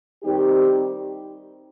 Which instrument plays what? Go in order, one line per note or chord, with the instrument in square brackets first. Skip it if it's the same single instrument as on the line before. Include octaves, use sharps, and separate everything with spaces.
[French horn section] D#3 G3 C4 D#4 G4